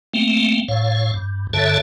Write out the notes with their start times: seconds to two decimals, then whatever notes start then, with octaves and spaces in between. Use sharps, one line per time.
0.13 A3 A#3 C4
0.68 A2 C#5 F5
1.14 G2
1.53 G2 D3 A4 C#5 E5 A5